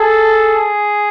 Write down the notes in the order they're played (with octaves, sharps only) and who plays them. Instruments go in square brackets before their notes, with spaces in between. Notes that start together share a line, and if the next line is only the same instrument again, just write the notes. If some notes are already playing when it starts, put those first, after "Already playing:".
Already playing: [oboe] G#4 [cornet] A4